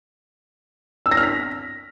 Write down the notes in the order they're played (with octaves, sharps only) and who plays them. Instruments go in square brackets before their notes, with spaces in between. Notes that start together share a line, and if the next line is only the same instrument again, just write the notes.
[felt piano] E6
A#6
F6
B6